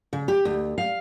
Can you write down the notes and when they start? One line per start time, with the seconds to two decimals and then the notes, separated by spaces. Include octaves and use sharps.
0.13 C#3
0.28 G4
0.45 D2
0.78 F5